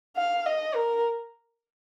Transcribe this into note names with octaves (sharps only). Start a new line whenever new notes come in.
F5
D#5
A#4